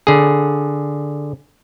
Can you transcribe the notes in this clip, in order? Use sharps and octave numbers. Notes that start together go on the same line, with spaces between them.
D3 G#4